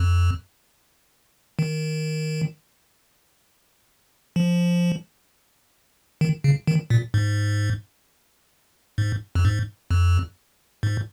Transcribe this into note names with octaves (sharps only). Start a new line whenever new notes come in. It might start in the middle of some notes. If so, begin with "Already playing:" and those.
Already playing: F2
D#3
F3
D#3
C#3
D#3
A#2
G#2
G#2
F2
G#2
F2
G#2